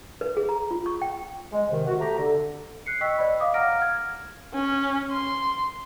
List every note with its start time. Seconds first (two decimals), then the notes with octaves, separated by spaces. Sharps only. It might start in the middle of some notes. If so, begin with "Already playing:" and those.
0.21 B4
0.37 G#4
0.49 A#5
0.71 F4
0.86 C#6
1.02 G5
1.53 G#3
1.69 C3 D#3
1.87 F#4
2.00 A3 G4 A#5
2.18 D3
2.86 F#6 C7 C#7
3.01 D#5 G5 C#6 E6 B6
3.18 C5 D5 D#5 B5
3.40 D#5 F5 D6 D#6
3.54 F5 F#5 A#5 F6 A#6 D7
3.79 F6 G#6
4.54 C#4
5.12 C6